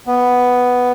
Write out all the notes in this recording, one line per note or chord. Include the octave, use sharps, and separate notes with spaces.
B3